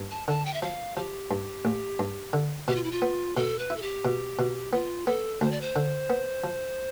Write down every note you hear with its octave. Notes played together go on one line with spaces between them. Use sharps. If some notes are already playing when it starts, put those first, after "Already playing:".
Already playing: G2
A5
D3 A5
G5
E5
F3 F5
F3 G4
G2
A1
G2
D3
B2 G4
F4
E4
F4
B3
B2 A4
B4
E4
A4
G4
B2
B2
B3 F4
B3 A4
D2 C5
D5
C5
D3
B3
F3